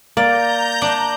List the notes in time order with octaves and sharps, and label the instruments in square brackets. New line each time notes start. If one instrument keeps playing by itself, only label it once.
[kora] A#3 [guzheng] D5 [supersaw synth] A#5 G6
[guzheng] D4